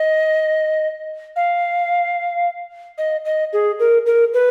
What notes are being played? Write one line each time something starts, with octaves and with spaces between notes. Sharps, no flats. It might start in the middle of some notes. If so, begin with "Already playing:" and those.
Already playing: D#5
F5
D#5
D#5
G#4
A#4
A#4
B4